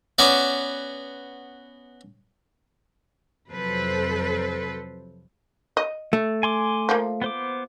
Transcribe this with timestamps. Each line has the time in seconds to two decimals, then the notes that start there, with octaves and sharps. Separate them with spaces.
0.18 B3 C#4 F#4 D5
3.49 F2 C3 F#3 A4 B4 C5
5.77 D#5
6.13 A3
6.43 G#5 C6 D6
6.89 F3 A#3
7.22 B3 C5 D6